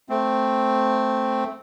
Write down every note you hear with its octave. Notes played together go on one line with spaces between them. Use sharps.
A3 C4